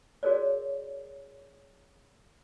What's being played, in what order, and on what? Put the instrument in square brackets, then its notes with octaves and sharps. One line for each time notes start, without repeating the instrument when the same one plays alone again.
[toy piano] F#4 G#4 A#4 C#5 D5